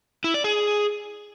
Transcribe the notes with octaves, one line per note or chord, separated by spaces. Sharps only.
E4
D5
G#4